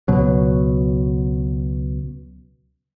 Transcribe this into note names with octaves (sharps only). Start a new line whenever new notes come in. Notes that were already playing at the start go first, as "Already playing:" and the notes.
C#2 B2 F#3